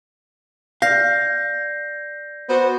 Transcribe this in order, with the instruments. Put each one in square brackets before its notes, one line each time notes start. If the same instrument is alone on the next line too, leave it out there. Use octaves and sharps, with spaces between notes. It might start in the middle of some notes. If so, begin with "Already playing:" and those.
[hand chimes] D5 [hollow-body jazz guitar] F5 [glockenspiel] G6 A#6 C7
[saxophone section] B3 F#4 C5